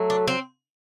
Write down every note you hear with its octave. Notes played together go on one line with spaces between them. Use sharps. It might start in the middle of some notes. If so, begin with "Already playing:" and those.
Already playing: F#3 A3
D4
C4